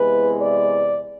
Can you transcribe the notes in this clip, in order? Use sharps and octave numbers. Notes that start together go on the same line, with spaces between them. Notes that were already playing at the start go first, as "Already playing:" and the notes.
Already playing: E2 C3 E3 G#3 B4
D5